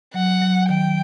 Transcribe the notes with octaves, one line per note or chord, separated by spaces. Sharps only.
F#3 F#5
F#3
D#3 G5